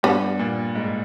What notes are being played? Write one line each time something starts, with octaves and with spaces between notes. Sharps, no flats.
G2 B3
A#2
G#2